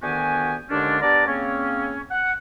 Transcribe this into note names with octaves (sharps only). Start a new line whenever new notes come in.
D2 D#3 B3 F#4 G4 G#5
D#2 D3 G#3 C#4 D4
B3 D4 G4 A#4 D5
C#3 A#3 C4 C#4
F#5